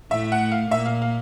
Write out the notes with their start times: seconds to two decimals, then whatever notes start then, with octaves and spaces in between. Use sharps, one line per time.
0.11 A2 A3 E5
0.32 F#5
0.52 F5
0.71 A#2 A#3 E5
0.86 F5
1.02 F5